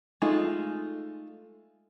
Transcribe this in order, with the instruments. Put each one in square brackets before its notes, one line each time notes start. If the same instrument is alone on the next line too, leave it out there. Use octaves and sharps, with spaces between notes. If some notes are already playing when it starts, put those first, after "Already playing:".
[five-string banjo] G#3 A3 D#4 F4